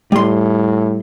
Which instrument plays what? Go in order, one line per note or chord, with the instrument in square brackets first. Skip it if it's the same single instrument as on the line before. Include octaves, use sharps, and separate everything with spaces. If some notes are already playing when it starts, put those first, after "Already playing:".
[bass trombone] A2 [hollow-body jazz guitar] G3 C6